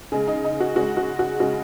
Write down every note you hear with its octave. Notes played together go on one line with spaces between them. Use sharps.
C#3 G#3 G#4
D#4
D#4
F#4
C#3 G#3 F#4
F#4
F#4
C#3 G#3 F#4